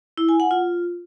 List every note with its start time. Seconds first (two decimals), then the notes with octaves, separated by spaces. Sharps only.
0.18 E4
0.29 G#5
0.40 F#5
0.51 F4